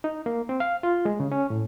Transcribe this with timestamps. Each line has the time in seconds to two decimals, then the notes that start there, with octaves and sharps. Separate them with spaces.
0.04 D#4
0.26 A#3
0.49 C4
0.60 F5
0.83 F4
1.05 G#3
1.20 C#3
1.32 C#4
1.50 A2